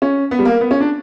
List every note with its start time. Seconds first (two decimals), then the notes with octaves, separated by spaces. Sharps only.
0.02 C#4
0.31 B3
0.39 G3
0.45 A#3
0.61 B3
0.71 C#4
0.80 D4